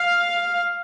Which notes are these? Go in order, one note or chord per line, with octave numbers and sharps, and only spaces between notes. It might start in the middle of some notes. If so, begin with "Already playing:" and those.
Already playing: F5